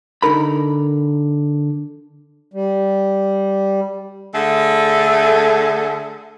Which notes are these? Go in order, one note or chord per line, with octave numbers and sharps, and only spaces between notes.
D3 D#4 A#4 B5
G3
D3 A3 G#4 A4